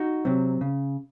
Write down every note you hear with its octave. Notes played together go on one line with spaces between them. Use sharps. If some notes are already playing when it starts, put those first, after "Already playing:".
Already playing: D#4 F#4
C3 F#3 C4
C#3